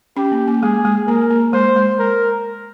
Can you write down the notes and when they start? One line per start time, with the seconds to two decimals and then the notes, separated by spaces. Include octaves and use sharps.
0.17 C#4 G4
0.32 A#3
0.47 A#3
0.62 G#3 G#4
0.85 G#3
1.07 A#3 A#4
1.30 A#3
1.53 G#3 C5
1.76 G#3
1.99 A#4